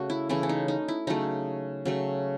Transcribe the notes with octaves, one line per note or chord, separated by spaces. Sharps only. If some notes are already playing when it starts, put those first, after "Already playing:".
Already playing: C#3 A3 F#4
E4
C#3 E3 A3 E4
C#4
D#4
D#4
E4
C#3 F#3 A3 D#4
C#3 F#3 A3